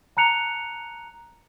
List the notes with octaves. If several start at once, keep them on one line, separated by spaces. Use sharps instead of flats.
A5 A#5 F#6 C#7 F7